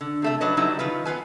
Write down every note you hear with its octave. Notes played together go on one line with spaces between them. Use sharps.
D3
C3 A3 E5
F#3 D4 G#4 B4 C#5 D#5
D3 F#3 G3 D#4 E4
D#3 F4 B4
B3 F4 B4 G#5